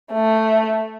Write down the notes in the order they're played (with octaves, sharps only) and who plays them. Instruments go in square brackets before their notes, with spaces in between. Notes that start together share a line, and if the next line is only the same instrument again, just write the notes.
[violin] A3